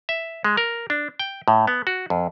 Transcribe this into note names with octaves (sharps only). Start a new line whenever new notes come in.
E5
G#3
A#4
D4
G5
A2
B3
F#4
F2